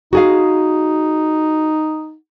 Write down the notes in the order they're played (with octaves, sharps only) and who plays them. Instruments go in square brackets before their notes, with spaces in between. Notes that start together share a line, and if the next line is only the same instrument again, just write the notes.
[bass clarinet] D#4 [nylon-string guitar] F#4 G#4 F5